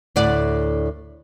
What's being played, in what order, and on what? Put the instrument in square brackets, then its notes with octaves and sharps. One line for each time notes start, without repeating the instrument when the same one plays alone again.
[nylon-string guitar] D2 A2 D5 F#5